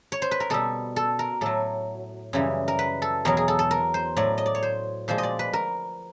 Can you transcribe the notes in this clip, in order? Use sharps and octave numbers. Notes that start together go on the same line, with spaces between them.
C#5
C5
B4
A#4
B2 G3 A4
A4
A#4
A2 F#3 A4
F#2 C#3 E3 G3
A#4
B4
A4
E2 B2 F#3 A#4
G#4
A4
A4
A#4
C5
A2 F#3 D5
D#5
D5
C#5
C5
A#2 F3 G#3 C5
D#5
D5
B4
A#4